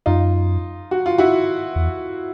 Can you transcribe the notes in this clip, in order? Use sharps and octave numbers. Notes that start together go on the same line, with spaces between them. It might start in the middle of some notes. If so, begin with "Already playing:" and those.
F#2 D#4 F4
F#4
F4
E4 F#4
E2